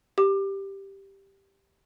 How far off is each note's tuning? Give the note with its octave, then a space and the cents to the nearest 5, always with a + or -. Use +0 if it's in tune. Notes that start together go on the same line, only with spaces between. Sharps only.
G4 +0 D6 +20